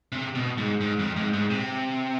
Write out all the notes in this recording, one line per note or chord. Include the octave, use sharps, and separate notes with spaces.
C3
B2
G#2
G#2
F2
G#2
G#2
C3